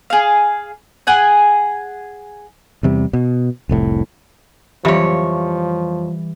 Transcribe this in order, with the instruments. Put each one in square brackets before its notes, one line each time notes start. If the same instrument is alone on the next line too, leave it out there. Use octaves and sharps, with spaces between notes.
[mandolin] G#4 F5
G#4 F#5 G#5
[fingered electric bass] E2 C3 G3
B2
F1 C2 A2
[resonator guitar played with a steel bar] F2 C#5 [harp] E3 G3 [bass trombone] F3 [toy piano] G4 E5